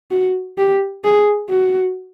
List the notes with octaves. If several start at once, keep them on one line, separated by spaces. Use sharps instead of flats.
F#4
G4
G#4
F#4